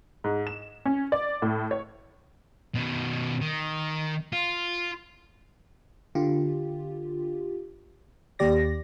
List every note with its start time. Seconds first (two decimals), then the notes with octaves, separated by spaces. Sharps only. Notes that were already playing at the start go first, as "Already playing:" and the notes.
0.24 G#2
0.47 E7
0.85 C#4
1.12 D5
1.42 A2
1.71 C#5
2.75 B2 D#3
3.41 D#3
4.33 F4
6.15 D3 F4 G4
8.39 D#2 G4 D5 A#6